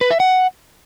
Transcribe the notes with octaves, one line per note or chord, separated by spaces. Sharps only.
B4
E5
F#5